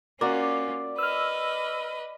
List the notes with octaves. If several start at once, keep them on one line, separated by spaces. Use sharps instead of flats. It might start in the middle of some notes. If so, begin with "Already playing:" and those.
A#3 C#4 F4 F#4 A#4 D5
B4 D#5 E6 F6